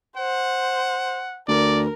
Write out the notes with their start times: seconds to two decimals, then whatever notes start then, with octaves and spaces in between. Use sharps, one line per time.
0.17 C5 F#5
1.48 D2 A#4 D5